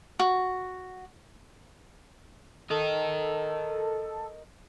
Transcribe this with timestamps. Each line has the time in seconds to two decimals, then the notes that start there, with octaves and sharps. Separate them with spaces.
0.19 F#4
2.70 A4 A#4 D#5